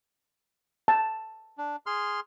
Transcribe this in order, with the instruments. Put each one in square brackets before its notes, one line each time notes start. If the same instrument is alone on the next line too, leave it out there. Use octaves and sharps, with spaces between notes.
[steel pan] A5
[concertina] D4
G#4 C6 F6